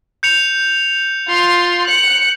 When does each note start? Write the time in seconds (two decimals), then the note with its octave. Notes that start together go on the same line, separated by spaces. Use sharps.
0.23 G6 C#7 F7
1.28 F4 C6
1.87 F#6 C#7